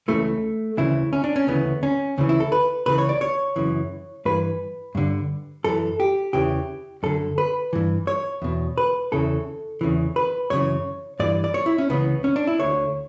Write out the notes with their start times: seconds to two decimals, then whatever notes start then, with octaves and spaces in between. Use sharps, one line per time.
0.08 C#2 C#3 E3 A3
0.77 D2 C#3 E3 E4
1.13 C#4
1.24 D4
1.36 C#4
1.47 D2 C#3 E3 B3
1.83 C#4
2.18 D2 C#3 E3
2.29 E4
2.40 A4
2.52 B4
2.86 C#2 C#3 E3 B4
2.98 C#5
3.09 D5
3.21 C#5
3.56 F#2 C#3 E3
4.25 G2 E3 B4
4.95 G2 D3
5.64 F#2 E3 A4
6.00 G4
6.33 E2 C#3 E3 G4
7.03 F#2 D3 A4
7.38 B4
7.73 G2 E3
8.07 C#5
8.42 E2 B2
8.78 B4
9.12 E2 C#3 E3 A4
9.81 E2 C#3 E3
10.16 B4
10.50 F#2 C#3 E3 C#5
11.20 G2 E3 D5
11.44 D5
11.54 C#5
11.66 E4
11.78 C#4
11.90 C#2 C#3 E3 B3
12.24 C#4
12.36 D4
12.47 E4
12.59 D2 D3 C#5